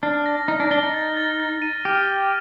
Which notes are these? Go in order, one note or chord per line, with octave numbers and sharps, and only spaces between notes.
D4 F6
A#6
D#4 A#6
D4
D4 G7
D#4
A6
A6
A6
D#7
G4 F6